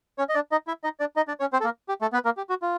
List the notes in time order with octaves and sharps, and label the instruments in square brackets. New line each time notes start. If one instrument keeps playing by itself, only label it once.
[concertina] C#4 C#5
D#5
D4 D5
D#4 D#5
E4 E5
D#4 D#5
D4 D5
D#4 D#5
D4 D5
C#4 C#5
C4 C5
A4
A#3 A#4
G4
A3 A4
B3 B4
A#3 A#4
G4
F#4
F4